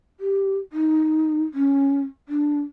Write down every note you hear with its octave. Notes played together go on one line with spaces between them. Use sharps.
G4
D#4
C#4
D4